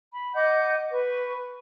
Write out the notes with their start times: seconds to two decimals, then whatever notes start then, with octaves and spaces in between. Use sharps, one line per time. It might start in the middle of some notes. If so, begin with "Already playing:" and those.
0.11 B5
0.35 D#5 F#5 D6 G6
0.90 B4 C#6